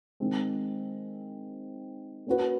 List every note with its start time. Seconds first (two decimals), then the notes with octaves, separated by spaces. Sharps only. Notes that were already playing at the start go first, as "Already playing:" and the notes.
0.20 D#3 G#3 C4
2.27 A#3 C#4 F#4 B4